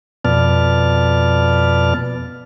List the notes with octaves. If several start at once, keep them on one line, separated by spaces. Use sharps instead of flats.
F2 B2 B3 D5 A5 F6